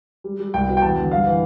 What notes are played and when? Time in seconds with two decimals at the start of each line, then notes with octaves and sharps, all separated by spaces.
0.24 G3
0.39 G3
0.54 C2 G5
0.68 B2
0.77 G5
0.82 E2 A5
0.97 D3
1.11 G2 F5
1.26 E3